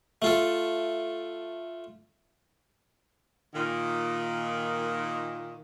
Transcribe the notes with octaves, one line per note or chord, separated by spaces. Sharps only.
A3 F4 A4
A#2 D#3